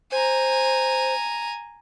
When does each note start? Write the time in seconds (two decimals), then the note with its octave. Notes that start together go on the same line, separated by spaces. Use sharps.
0.12 C5 G#5 A#5